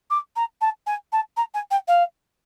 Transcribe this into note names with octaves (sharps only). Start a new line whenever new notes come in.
D6
A#5
A5
G#5
A5
A#5
G#5
G5
F5